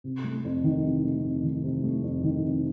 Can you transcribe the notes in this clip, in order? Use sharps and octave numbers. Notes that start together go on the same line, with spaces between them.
C3
A3
F2
D#3
C3
A3
F2
D#3
C3
A3
F2
D#3
C3